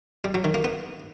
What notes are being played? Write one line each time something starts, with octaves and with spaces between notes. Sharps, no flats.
G3
F#3
D#3
A#3
B3